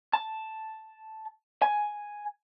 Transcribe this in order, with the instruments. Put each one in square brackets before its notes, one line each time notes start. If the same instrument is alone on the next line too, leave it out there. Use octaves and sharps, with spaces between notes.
[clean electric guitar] A5
G#5